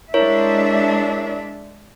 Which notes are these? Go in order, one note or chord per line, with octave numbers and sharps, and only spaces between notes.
G#3 D4 E4 A#4 C#5 E5